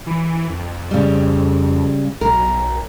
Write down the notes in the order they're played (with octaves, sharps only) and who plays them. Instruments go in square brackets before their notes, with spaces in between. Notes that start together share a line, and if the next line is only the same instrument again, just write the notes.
[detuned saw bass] E3
F2
[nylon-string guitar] C#3 G3
[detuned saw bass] B1 [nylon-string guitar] A#4